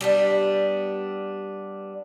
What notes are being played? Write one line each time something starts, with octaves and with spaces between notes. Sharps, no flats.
G3 B3 D4